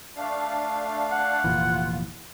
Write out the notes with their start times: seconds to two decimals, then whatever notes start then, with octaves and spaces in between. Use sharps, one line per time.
0.17 A3 D4 F5
1.12 F#5
1.44 F1 A#2 E3 F4